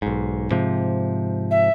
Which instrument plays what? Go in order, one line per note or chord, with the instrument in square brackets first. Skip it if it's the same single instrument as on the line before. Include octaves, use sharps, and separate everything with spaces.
[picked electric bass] B1 G#2
G#2 C3 F3
[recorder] E5